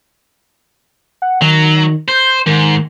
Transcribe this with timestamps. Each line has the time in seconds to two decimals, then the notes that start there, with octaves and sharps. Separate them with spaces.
1.22 F#5
1.42 D#3 F#3
2.08 C5 G6
2.47 G#2 D#3